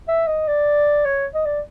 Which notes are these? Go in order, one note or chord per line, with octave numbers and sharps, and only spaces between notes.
E5
D#5
D5
C#5
D#5
D5